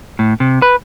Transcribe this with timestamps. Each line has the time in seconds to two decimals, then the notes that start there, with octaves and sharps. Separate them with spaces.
0.19 A2
0.40 C3
0.62 B4